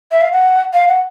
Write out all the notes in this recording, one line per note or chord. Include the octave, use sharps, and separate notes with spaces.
E5
F5
F#5
F5
F#5